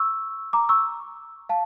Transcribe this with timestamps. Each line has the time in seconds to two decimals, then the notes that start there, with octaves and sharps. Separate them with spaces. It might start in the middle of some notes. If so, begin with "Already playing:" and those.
Already playing: C#6 E6
0.53 A#5 D6
0.69 C#6 E6
1.49 F5 A5